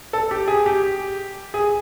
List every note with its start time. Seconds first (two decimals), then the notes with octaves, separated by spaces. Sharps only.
0.13 A4
0.31 G4
0.48 G#4
0.66 G4
1.54 G#4